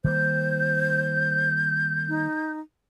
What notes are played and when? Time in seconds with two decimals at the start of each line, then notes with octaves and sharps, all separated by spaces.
0.04 D#3 G3 A#3 C5 G6
2.09 D#4